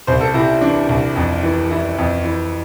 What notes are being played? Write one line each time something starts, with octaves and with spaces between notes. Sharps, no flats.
C2 C5
A4
C3 E4
E3 D4
C2
F2
E3
E3 E4
F2
E3